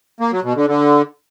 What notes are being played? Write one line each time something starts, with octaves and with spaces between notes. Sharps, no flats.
A#3
F#3
B2
D3
D3